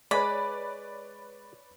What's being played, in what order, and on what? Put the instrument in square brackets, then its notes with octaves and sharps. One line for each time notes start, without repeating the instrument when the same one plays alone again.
[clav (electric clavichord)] G#3 [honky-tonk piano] B4 C#5 D5 [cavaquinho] B5